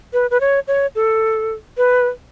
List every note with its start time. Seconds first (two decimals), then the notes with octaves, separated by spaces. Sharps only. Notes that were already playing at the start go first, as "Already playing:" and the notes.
0.13 B4
0.31 B4
0.41 C#5
0.68 C#5
0.95 A4
1.77 B4